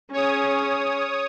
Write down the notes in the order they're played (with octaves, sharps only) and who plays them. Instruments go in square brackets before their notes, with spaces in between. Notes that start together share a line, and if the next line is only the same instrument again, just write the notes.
[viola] C#4 G#4 [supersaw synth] C#5 D#6